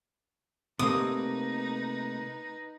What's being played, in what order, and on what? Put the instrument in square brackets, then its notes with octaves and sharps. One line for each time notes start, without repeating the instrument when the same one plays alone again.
[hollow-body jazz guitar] C3 A3 A#3 [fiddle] D#4 B4 [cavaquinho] D#6